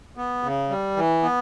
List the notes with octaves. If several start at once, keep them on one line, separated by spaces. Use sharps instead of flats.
B3
C#3
G3
E3
B3